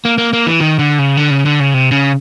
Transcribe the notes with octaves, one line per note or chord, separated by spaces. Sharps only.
A#3
A#3
A#3
E3
D#3
D3
C#3
D3
C#3
D3
C#3
C3
C#3